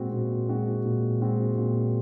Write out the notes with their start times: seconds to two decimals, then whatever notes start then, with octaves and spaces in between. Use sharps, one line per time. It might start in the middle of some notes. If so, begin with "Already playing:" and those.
Already playing: A#2 G#3 C4 F#4
0.12 A#2
0.49 G#3 C4 F#4
0.85 A#2
1.21 G#3 C4 F#4
1.57 A#2